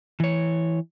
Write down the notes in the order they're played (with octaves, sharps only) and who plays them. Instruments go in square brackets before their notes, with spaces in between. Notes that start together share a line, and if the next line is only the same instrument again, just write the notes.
[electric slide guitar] E3 C#5